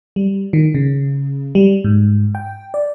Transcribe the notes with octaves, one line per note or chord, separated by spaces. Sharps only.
G3
D#3
C#3
G3
G#2
G5
D5